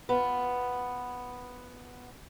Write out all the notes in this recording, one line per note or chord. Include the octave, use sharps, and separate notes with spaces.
B3 F4